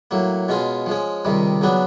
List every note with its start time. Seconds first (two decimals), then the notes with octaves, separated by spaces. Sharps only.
0.11 A2 F#3 A#3
0.48 B2 G#3 C#4 F4
0.86 F3 G#3 C#4
1.25 C#2 C3 D#3 G3
1.61 C#3 F#3 B3 D4